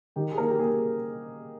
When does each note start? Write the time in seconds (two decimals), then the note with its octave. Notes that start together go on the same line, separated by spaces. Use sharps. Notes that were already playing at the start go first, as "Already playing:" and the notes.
0.16 D#3 G4
0.32 G#4
0.38 A#3 A#4
0.49 G4
0.59 A#3 G#4